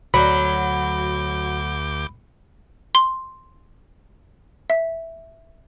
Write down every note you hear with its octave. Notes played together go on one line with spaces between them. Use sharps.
D2 F#3 B5 D6 G6
C6
E5